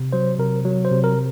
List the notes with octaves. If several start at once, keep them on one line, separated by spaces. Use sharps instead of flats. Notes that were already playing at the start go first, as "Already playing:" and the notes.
Already playing: C3
F#3 C5
C3 A#4
F#3
C5
C3
A#4